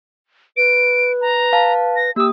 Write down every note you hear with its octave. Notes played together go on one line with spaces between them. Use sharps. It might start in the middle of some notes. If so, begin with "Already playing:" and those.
B4 D7
A#5
F5 A5
A#6
A#3 G4 D#6 E6